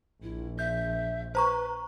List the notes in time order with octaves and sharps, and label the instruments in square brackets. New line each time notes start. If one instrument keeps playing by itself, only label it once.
[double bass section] A#1 [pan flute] E4
[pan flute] E5 [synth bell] G6
[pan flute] B4 [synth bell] C5 A#5 C#6